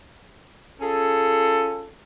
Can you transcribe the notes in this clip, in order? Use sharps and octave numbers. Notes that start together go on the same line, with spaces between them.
C#4 F4 G#4 A4